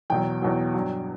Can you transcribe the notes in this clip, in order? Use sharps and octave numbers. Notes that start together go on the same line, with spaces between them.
E2 B2 F#3 G5
E2 B2 F#3
G2 F#3